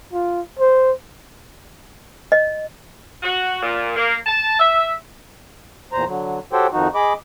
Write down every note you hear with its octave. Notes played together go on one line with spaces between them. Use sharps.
F4
C5
D#5
F#4
A#2
A#3
A5
E5
E2 A#2 C5 A#5
D3 F#3
F#4 G4 A4 C5 C#5 G5
F2 D#3 F3 D#4 F#4
G#4 D#5 B5 D6